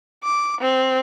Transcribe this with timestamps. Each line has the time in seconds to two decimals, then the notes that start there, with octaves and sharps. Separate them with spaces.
0.23 D6
0.61 C4